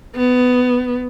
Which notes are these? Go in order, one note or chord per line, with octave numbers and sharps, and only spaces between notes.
B3